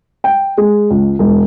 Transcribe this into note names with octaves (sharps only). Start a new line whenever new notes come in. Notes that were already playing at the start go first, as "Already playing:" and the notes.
G5
G#3
C#2
E1